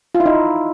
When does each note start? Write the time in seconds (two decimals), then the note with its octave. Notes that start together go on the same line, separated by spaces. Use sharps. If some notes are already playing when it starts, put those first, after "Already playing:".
0.15 F4
0.20 E4
0.26 D#4